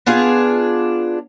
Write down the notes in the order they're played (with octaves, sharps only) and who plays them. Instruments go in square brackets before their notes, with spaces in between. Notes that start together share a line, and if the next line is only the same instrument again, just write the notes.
[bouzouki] B3 D4 F4 G#4